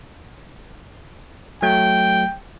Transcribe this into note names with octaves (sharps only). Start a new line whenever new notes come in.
F#3 A3 G5